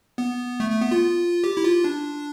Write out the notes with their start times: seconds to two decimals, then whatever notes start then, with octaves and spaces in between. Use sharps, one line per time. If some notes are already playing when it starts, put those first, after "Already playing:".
0.18 B3
0.60 A3
0.70 A3
0.81 B3
0.91 F4
1.44 G4
1.57 E4
1.64 F4
1.84 D4